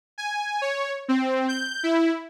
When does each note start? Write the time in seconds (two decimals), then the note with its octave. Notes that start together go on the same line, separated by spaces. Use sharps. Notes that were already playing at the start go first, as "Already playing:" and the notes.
0.18 G#5
0.62 C#5
1.08 C4
1.48 G6
1.83 E4